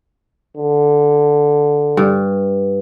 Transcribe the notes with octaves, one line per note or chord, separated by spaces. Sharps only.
D3
G2